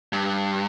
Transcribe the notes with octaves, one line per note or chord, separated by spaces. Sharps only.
G2